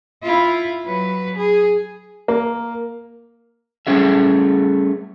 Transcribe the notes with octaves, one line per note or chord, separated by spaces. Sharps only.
E4 F4
F#3 B4
G#4
A#3
G3 A3 C#4 G#4 E5